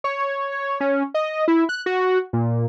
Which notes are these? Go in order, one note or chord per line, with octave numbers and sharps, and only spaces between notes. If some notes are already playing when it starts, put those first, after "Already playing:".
C#5
C#4
D#5
E4
F#6
F#4
A#2